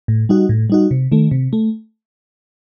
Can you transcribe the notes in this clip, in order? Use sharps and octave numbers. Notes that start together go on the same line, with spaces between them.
A2
G3 D#4 F#4
A2
G3 D#4 F#4
C3
D#3 A3
C3
A3